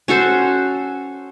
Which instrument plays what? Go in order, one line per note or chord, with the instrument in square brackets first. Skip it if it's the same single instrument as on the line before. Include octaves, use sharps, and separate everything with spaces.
[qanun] C#4 F#4 A4 C5